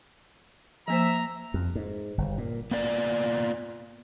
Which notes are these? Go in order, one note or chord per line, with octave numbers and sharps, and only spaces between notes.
F3 A#3 C5 E5 A#5 E6
F2
G#2
G1
A#2
A#3 B3 F4 D5